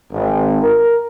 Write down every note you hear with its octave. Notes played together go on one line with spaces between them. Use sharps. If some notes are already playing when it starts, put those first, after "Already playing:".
G#1
A#4